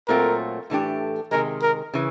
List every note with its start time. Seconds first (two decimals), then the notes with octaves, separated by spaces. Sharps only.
0.08 A#2 F#3 A3 C4 F4 A#4
0.70 A2 E3 A3 D4 G4
1.31 C3 D#3 G#3 A#4
1.63 A#4
1.94 C#3 E3